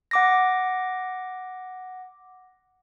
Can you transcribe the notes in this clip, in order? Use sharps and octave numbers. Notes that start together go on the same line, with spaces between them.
F#5 D6 A#6